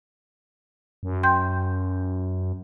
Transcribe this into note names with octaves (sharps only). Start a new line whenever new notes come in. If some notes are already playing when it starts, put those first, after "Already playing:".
F#2
G5 C6 G6